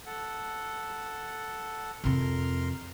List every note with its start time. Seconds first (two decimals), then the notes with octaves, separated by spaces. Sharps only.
0.06 A4 F#5
2.04 F2 C3 A#4 C6 F6